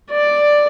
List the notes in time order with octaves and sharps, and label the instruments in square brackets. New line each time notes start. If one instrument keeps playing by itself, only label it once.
[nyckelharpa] D5